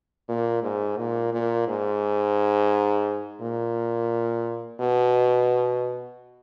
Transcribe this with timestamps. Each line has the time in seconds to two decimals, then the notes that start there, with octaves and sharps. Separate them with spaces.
0.28 A#2
0.63 G#2
0.97 A#2
1.33 A#2
1.68 G#2
3.41 A#2
4.80 B2